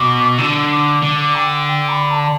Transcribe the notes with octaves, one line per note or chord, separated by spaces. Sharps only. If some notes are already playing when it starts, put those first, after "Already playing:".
Already playing: B2 D6
D3 E6
D6
D3 D6
G5
G5
B5
A5